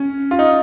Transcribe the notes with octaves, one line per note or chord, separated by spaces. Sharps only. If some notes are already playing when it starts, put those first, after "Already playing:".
Already playing: C#4
F4
D#4